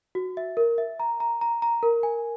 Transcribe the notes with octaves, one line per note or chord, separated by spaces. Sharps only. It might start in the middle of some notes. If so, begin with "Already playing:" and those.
F#4
E5
A#4
E5
A#5
A#5
A#5
A#5
A#4
G#5